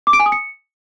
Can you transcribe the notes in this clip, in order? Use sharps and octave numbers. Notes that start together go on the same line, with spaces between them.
D6
D7
G#5
D#6
C#7